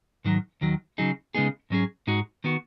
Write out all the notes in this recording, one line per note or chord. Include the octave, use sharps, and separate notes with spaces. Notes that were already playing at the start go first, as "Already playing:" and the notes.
G#2 D#3 F#3
D#2 D#3 F#3
C#3 F#3 D#4 G#4
C#3 G#3 B3 D#4 G#4
G#2 F#3 C#4 G#4
G#2 G#3 D#4 F#4
D#3 B3 F#4